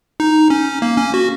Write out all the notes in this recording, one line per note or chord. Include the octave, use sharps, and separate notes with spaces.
D#4
C#4
A#3
C#4
F#4